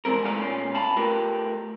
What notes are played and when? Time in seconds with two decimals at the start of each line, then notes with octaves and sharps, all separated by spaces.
0.05 E3 G3 G#3 C4 A#4
0.24 G#3 A3 B3 D5 F5
0.41 A#2 C#4 F4
0.75 F5 A5 B5
0.97 A3 F4 G4 A#4 B4